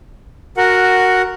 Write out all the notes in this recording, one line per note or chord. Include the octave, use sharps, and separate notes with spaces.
F#4 A#4 F#5